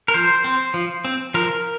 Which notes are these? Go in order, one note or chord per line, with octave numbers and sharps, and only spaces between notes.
A#4
F3 C5
C4
F3
C4
F3 A#4